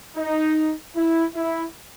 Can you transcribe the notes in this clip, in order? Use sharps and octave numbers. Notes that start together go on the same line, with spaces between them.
D#4
E4
E4